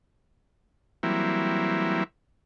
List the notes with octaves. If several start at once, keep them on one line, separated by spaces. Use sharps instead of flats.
E3 F#3 G3 A#3 C4 E4